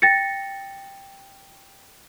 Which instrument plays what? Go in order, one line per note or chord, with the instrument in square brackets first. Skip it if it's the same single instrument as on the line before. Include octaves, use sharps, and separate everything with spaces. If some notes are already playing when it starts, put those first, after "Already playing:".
[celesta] G5 A6 A#6 C#7